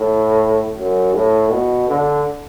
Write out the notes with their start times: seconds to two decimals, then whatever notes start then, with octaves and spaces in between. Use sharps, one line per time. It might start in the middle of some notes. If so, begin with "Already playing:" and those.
Already playing: A2
0.77 F#2
1.14 A2
1.51 B2
1.88 D3